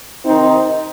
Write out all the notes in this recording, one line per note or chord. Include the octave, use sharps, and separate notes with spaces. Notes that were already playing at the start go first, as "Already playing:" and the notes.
C3 D#3 C4 D#4